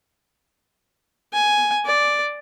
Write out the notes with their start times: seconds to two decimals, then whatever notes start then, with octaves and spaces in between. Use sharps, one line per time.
1.34 G#5
1.86 D5